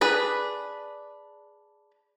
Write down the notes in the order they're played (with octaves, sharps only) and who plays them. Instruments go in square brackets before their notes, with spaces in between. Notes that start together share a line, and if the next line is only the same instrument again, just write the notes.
[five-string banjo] D4 G#4 B4